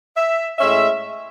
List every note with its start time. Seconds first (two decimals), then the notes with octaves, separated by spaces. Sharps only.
0.17 E5
0.59 A2 G#3 C#4 E5